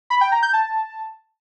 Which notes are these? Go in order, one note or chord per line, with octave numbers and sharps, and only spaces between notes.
B5
G5
A#5
G6
A5